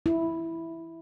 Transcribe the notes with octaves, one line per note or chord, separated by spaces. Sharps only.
E4